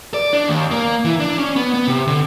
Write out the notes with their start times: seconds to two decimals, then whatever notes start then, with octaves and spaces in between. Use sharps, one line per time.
0.14 D5
0.33 D4
0.48 D#2
0.71 A#3
1.05 E3
1.20 D4
1.38 C#4
1.56 B3
1.74 B3
1.87 C3
2.08 D3